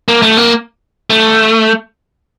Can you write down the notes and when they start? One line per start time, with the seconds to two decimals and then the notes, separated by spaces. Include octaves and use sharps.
0.08 A#3
0.22 A3
0.37 A#3
1.10 A3